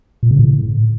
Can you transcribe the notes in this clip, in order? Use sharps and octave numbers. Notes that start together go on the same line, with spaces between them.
A#2
C#3
A2